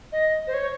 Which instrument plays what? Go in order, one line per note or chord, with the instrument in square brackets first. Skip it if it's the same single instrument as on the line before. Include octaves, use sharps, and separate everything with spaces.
[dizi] D#5
C5
C#5